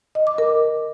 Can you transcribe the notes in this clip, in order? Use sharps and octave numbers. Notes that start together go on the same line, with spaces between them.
D#5
D6
A#4